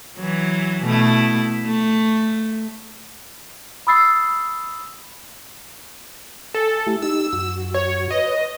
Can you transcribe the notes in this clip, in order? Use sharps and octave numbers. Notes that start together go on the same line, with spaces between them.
E3 F#3
B2 A3 E4
A3
B5 D#6 E6 A6 C7
A4 G#5
A3 E4 G4
D#4 G4 E6
F#2 F#4
C#5
B4 C#5 D#5